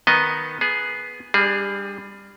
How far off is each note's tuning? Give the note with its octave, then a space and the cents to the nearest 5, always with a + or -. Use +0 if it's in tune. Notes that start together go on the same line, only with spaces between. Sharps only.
D#3 +0 B3 +0 D#5 +0
B3 -5 G#4 +5
G3 +25 D4 +0 G#4 +0